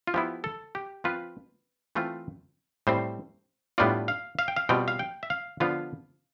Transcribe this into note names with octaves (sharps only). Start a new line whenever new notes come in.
F4
F3 B3 E4 G4
A4
G4
F3 C4 F4 B4
E3 A3 C4 F4
A2 G3 C4 C5
A2 G3 B3 D4 F4 D5
F5
F5
G5
F5
B2 G3 C4 F4 G5
F5
G5
E5
F5
D3 F3 B3 F4 F5